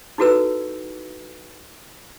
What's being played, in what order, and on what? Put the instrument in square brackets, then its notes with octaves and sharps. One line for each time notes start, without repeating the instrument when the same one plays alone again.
[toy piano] D#4 E4 F#4 A4 B4 E6